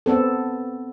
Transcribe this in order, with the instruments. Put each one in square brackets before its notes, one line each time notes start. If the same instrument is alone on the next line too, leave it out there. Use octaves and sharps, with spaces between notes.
[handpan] B3 C4 A4